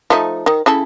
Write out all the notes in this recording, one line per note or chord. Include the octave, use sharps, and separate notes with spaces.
F3 A3 D#4
D#3
C#3 E4 A4